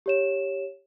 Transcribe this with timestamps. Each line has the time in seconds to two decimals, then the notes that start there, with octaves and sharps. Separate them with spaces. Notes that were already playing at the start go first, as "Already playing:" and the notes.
0.06 G4 C#5 E7